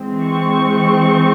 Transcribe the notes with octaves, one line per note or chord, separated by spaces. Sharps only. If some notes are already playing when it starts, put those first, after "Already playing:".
Already playing: E3 G#3 C4
C#6